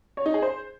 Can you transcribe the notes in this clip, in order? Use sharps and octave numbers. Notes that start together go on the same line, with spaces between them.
C#5
D#4
G#4
C5